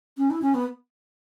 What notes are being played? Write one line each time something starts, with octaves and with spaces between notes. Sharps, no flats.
C#4
E4
C#4
B3